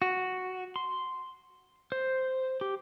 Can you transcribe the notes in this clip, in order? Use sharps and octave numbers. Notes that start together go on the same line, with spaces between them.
F#4
C6
C5
G4